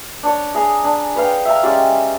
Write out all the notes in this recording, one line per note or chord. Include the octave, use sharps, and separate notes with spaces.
D4 C#5
G#4 G#5 A#5
D4
B4 C#5 F5 G5
E5 F5 A#5
G#3 C#4 G4 D5